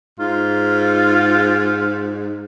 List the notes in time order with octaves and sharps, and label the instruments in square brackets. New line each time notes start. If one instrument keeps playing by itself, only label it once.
[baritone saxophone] G#2 [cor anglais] F4